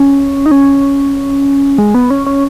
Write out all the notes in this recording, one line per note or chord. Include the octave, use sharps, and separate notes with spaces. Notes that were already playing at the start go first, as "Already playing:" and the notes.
Already playing: C#4
D#4
C#4
G#3
B3
C#4
C#4